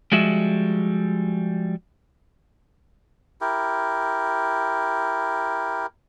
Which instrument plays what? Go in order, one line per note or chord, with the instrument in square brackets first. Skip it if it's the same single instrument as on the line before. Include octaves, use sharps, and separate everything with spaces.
[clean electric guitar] F3 G3 G#3 F#4 E5
[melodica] E4 G4 A#4